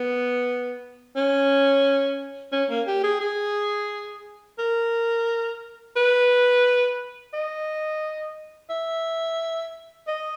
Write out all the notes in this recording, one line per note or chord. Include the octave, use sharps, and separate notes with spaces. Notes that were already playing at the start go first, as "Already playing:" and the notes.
Already playing: B3
C#4
C#4
A#3
G4
G#4
G#4
A#4
B4
D#5
E5
D#5